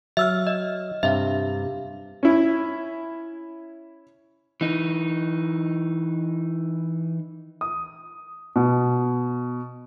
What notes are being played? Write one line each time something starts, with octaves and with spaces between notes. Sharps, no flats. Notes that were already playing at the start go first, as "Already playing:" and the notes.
F#3 E5 E6 F6
D#5
G2 C3 E5 F5
C#4 E4
E3 D#4
D#6
B2